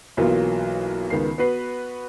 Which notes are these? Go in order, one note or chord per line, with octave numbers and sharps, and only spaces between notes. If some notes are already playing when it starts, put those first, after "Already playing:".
B1 E3 F#3 A#3 B3 F4
C#2 D#3 B3 C7
B3 F#4 B4 C7